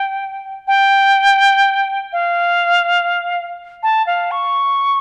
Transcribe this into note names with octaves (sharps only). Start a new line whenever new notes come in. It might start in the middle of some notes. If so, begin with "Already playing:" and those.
Already playing: G5
G5
F5
A5
F5
C#6